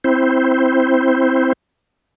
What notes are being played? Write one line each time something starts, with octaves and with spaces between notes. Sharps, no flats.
C4 E4 C5